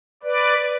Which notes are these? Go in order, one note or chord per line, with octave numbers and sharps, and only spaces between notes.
B4 D5